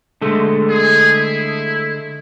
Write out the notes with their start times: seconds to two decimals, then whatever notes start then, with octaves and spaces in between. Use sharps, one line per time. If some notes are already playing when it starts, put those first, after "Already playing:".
0.21 D3 G#3 A3
0.69 G#4
1.15 E4